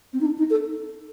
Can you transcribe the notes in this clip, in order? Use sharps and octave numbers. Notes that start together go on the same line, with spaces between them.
C4
D#4
D4
D#4
A4